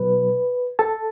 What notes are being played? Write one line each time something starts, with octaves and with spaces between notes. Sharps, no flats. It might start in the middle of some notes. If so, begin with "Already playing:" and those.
Already playing: B2 F#3 B4
A4 A5